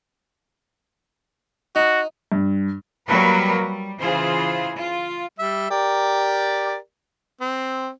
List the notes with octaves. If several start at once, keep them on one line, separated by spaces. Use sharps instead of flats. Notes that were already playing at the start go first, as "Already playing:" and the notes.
D#4 F#4
G2
F#3 G3 A#3 F#4 A#4 B4
G3
C#3 E3 F4 G#4 C5
F4
G3 E5
G4 A#4 D5
C4